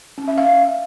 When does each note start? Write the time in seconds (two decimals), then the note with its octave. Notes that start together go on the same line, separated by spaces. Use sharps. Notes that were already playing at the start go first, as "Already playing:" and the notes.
0.18 C#4
0.28 E5
0.38 F5